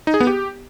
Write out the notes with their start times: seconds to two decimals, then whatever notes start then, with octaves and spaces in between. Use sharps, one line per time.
0.07 D#4
0.14 G#4
0.20 B3
0.27 G4